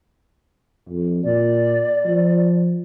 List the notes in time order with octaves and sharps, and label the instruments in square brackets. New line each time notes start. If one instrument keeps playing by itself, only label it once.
[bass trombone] F2
[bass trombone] A#2 [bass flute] D5
[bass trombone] F3